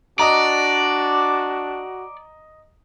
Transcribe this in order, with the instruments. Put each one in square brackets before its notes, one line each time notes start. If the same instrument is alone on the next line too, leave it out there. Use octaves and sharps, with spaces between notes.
[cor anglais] D4 [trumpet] F#4 [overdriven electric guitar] D5 [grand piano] D#5 A#5